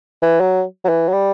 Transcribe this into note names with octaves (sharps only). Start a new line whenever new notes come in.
E3
F#3
F#3
E3
F#3
G3